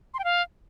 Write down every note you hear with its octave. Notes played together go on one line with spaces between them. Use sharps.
C6
G5
F5